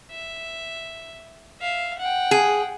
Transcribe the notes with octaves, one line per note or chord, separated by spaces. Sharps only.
E5
E5 F5
F#5 G5
G#4